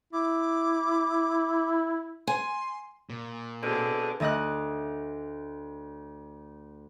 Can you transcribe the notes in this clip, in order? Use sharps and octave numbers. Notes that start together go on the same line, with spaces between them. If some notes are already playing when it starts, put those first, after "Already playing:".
E4 D6
G#5 C6
A#2
B2 D3 C4 G#4
D2 A3 D#5 D#6 F#6